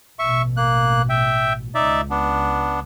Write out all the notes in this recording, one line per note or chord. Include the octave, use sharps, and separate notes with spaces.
A1 B2 E5 C#6
A#3 F#6
E5 G5
C#2 D#4 D5 E5
B3 D4